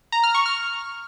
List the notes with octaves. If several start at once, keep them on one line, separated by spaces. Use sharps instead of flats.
A#5
F6
C#6
F6